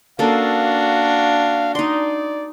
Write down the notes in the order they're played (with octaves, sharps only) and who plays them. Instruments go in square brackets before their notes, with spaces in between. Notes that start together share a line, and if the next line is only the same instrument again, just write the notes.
[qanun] A#3 C#4 A4 [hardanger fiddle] D4 F#4 [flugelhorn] F5
[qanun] D#4 C6 [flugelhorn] D5